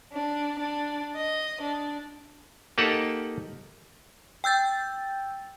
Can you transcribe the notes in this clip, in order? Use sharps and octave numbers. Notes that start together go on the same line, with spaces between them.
D4
D4
D#5
D4
A#3 D#4 G4 A4 F#5
G5 E6 G6 A6